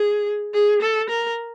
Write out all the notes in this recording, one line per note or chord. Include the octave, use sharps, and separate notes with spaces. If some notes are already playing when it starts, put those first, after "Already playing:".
Already playing: G#4
G#4
A4
A#4